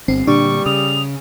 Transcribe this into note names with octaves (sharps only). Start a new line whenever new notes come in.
G1 C4
A#2 D3 G3 D4 C#6
C#3 D#6 F7